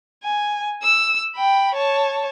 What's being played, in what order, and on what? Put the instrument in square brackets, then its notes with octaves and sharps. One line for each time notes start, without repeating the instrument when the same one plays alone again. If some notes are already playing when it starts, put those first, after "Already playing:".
[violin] G#5
E6
G5 B5
C#5 A5